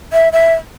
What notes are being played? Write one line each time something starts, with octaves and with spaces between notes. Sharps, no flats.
E5
E5